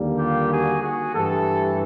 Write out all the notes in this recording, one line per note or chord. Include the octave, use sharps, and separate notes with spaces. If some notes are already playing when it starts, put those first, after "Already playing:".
Already playing: D#2 D3 G3 A#3
F4 G4
F#4 G#4
F#4 G#4
G2 E3 A3 G4 A4